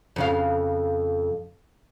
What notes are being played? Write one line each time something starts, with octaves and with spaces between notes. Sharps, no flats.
F2 C#3 F5